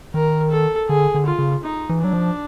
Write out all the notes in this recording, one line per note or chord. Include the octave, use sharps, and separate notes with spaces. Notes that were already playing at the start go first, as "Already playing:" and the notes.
D#3 A#4
A4
D3 G#4
D3
F4
C#3
D#4
E3
F#3 D4
F3